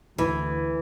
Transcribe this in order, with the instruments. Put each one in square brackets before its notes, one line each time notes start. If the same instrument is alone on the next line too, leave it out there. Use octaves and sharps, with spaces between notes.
[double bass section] D2 [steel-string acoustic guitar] E3